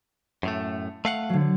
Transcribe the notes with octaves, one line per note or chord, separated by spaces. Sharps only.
F#2 A2 A3
A3 F5 F#5
D3 F#3